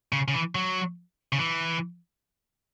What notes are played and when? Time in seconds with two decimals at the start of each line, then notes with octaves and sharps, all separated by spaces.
0.12 C#3
0.28 C#3
0.34 E3
0.55 F#3
1.32 C#3
1.38 E3